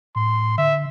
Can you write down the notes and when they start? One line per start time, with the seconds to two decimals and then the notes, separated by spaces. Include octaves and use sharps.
0.16 A2 C6
0.58 D3 E5